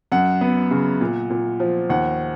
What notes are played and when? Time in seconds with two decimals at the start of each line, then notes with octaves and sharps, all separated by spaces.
0.12 F#2 F#5
0.41 B3
0.71 C#3
1.01 A#2
1.30 A#2
1.60 F3
1.90 D#2 F#5